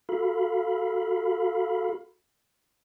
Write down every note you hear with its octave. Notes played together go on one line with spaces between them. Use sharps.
F#4 A4 F5 B5